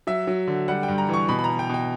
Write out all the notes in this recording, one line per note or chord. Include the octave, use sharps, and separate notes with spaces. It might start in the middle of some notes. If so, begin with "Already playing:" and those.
F#3 E5
F#3
D3
G3 F#5
G5
G2
A#5
E3 C#6
B2 B5
B5
A#5
B2
G5
B2 G5